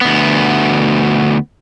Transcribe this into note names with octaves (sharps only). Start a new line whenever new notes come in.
D2 B3